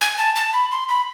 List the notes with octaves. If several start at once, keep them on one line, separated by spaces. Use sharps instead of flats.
G#5
A5
A5
B5
C6
B5